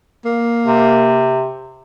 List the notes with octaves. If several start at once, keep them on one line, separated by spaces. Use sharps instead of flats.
A#3
C3